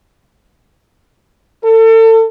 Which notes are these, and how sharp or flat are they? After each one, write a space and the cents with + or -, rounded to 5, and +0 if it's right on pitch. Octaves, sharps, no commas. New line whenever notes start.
A4 +35